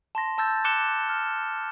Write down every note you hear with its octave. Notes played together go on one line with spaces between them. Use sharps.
A5 C6 A#6
A5 E6 G6 A6
D6 F#6 C#7 E7 G7
F6